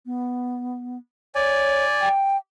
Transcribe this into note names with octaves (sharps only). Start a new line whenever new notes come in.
B3
C#5 D5 G#5
G5